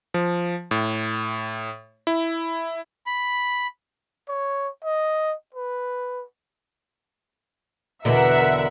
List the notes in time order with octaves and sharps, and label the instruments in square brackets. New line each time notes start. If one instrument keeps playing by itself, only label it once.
[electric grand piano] F3
A2
E4
[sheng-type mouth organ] B5
[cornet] C#5
D#5
B4
[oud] E2 B2 D3 [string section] A#4 E5 F#5